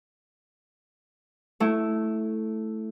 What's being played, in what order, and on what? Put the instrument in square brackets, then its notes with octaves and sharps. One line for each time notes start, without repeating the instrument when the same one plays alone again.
[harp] A3 E4